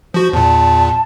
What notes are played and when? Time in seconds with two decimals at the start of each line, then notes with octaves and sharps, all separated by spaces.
0.14 F3 F#4 C5
0.33 E2 A#2 A5